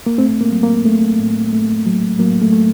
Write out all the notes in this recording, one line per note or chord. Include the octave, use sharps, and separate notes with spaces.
A#3
A3 C4
A#3
F#3
A#3
A3
A2
A3
F#3
F#3 A#3
A3
A3